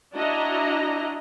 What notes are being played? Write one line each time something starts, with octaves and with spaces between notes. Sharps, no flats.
D4 E4 F#4 D#5 A#5